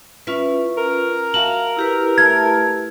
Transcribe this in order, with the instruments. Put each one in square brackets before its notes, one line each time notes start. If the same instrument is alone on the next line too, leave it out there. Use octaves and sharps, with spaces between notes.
[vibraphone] C#4 F4 B4 [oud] E4
[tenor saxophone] A#4
[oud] F#4 [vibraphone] E5 F5 A5 [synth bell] F#7
[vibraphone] E4 G4 B4
[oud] A3 [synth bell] G#6